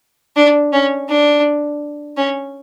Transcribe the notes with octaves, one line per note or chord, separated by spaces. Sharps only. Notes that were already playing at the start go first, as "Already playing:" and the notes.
D4
C#4
D4
C#4